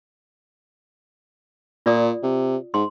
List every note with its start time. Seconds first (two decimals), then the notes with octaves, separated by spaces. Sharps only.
1.86 A#2 F4 D5 D#6
2.23 C3
2.74 G#2 C6